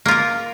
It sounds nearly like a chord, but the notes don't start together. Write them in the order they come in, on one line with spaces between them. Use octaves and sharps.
A#3 F4 A#4